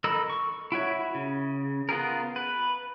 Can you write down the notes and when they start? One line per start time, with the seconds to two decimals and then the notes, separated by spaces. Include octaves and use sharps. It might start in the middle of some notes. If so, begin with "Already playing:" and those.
0.04 D#4 A4 A#4 B5 E6
0.30 C#6
0.72 E4 F#4 C#5 E5
1.14 C#3
1.89 B3 F4 G#4 A#4
2.36 B4